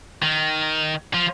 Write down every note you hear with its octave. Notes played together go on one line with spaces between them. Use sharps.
D#3
F3